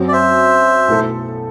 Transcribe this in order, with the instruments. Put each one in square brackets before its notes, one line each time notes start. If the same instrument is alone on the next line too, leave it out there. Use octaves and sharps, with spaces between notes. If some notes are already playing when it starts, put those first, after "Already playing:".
Already playing: [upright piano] F#2 F#3 C4
[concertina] D5
C5 E5
[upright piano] B1 B2 A3 E4 A4